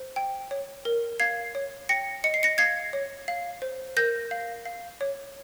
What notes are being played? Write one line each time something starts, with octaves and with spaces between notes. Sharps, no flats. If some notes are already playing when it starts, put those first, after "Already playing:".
Already playing: C5
G5
C#5
A#4
F5 G#6 C7
C#5
G5 A#6 C#7
D#5 C#7
C7
A#6 C#7
F5 G#6 C7
C#5
F5
C5
A#4 G6 A#6
F5
F5
C#5